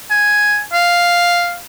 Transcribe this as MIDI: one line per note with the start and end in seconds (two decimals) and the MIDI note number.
0.11 0.61 80
0.73 1.57 77